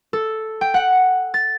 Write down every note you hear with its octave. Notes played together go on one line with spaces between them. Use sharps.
A4
G5
F#5
A6